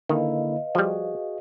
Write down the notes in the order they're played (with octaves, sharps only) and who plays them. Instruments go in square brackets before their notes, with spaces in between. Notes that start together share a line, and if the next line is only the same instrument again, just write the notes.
[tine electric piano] D3 A#3 E4 [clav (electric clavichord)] D#3 [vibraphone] B4 D#5 F5
[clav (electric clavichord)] F3 G3 [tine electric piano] F#4 G#4